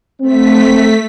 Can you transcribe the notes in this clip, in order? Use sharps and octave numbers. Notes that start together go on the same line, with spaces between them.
A3 C4 B6